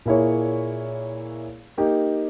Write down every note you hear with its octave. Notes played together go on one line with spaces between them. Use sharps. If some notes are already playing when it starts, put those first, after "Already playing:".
A#2 A#3 E4 G#4 C#5
A#3 D#4 G4